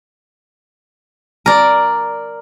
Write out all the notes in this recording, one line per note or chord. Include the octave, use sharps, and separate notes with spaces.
A#4 D5